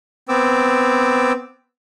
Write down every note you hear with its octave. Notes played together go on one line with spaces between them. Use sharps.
B3 C4 D6 E6